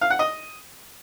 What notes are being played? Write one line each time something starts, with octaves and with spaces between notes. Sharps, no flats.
F5
F#5
D#5